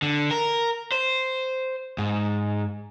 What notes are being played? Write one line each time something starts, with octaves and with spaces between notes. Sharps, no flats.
D3
A#4
C5
G#2